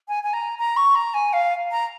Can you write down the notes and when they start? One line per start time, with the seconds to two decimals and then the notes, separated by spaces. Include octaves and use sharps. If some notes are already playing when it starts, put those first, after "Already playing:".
0.08 G#5
0.23 G#5
0.33 A#5
0.59 A#5
0.77 C#6
0.95 A#5
1.14 G#5
1.33 F5
1.71 A#5